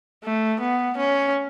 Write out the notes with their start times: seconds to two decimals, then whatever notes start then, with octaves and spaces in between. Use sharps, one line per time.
0.24 A3
0.60 B3
0.98 C#4